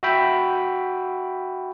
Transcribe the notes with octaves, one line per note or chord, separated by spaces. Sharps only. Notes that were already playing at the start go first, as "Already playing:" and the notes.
F#4 E5 G5 B5